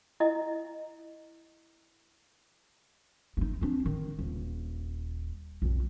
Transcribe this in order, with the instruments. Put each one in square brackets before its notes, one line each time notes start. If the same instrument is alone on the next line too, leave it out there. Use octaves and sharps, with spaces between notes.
[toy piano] E4 D#5
[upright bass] A3 D#4
C4 D4
D#3
D#1
B1 F2